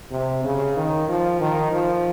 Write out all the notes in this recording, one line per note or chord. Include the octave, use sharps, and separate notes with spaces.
C3
C#3
D#3
F3
D#3
F3